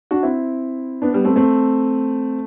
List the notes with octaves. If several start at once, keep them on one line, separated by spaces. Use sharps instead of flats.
D4 F#4
C4 E4
B3 D4
G3 B3
A3 C4
A3 C4